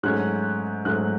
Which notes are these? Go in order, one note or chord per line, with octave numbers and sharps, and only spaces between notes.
G#2 F#3 A3 C#4 F#6
G#2 F#3 A3 C#4 F#6